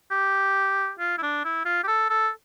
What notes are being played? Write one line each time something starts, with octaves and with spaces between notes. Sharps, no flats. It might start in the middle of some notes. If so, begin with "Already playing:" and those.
G4
F4
E4
D4
E4
F4
G4
A4
A4